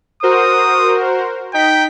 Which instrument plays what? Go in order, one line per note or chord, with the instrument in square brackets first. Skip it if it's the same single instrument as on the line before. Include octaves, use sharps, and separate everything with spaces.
[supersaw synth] F#4 A#4 C5 [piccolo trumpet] D#6
[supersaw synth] D#4 B6 [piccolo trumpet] G5